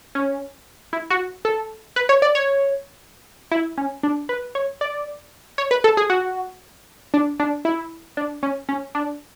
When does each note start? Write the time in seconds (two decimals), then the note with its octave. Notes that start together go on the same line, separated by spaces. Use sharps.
0.15 C#4
0.93 E4
1.10 F#4
1.45 A4
1.96 B4
2.09 C#5
2.22 D5
2.35 C#5
3.51 E4
3.78 C#4
4.03 D4
4.29 B4
4.55 C#5
4.81 D5
5.58 C#5
5.71 B4
5.84 A4
5.97 G#4
6.10 F#4
7.14 D4
7.40 D4
7.65 E4
8.17 D4
8.43 C#4
8.69 C#4
8.95 D4